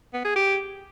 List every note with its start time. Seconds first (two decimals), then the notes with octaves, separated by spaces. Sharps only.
0.13 B3
0.25 G#4
0.36 G4